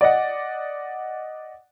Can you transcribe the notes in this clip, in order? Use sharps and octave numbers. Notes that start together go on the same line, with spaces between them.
D5 D#5 F#5